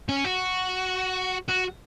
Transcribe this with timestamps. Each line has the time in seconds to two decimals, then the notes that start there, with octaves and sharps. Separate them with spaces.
0.09 C#4
0.24 F#4
1.48 F#4